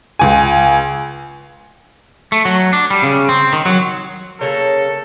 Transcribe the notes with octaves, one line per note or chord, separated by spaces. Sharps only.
C#2 G#5
A3
F#3
D4
G3
C#3
C4
D#3
F#3
C#3 A#3 A4 A#4 C#5